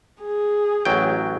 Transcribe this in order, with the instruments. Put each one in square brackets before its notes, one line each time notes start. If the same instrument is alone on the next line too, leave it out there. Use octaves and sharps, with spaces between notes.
[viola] G#4
[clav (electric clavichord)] A1 F#3 G5